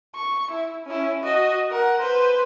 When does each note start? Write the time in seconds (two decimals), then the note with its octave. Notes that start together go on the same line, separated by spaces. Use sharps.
0.15 C#6
0.51 E4
0.86 C#4 E4
1.23 F#4 D#5
1.70 A#4 F#5
2.00 B4 C5